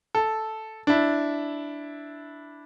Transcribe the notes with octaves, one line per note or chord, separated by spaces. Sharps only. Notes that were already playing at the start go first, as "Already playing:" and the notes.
A4
D4 E4